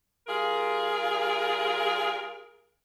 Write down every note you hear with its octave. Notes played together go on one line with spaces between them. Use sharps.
G3 F4 G#4 A#4